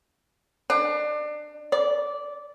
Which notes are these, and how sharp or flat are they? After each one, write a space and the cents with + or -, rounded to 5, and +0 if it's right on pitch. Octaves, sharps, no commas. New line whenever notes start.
D4 +30
D5 -10